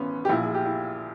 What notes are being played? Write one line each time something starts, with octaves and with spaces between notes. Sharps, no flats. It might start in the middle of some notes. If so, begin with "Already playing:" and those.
Already playing: G#1 E3 B3 C#4
G4
A#1 A#2 E4
G#4
G4
E4